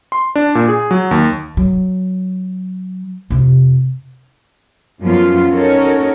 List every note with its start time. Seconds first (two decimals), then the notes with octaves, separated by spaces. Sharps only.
0.12 C6
0.36 D4
0.55 A#2
0.68 G#4
0.91 F#3
1.11 D#2
1.57 F#3
3.30 F2 C3
5.02 F#2 F3 F#3 B3 F4
5.51 C#4 D#4 F#4 A4 A#4 C#5